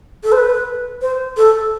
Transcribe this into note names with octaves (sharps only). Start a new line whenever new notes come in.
A4
C5
B4
C5
A4